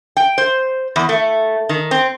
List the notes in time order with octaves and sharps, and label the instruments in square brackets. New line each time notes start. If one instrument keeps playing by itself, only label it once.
[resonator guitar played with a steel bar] G5
C5
E2
A3
D#3
C4